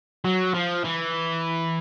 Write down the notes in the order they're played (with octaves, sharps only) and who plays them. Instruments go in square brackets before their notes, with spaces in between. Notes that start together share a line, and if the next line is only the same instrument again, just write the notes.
[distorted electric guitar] F#3
F3
E3